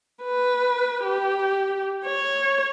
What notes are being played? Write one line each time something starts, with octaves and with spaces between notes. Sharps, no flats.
B4
G4
C#5